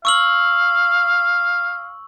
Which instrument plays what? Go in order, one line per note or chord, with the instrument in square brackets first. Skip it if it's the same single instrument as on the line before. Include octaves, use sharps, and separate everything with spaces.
[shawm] F5 [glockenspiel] C#6 E6 F#7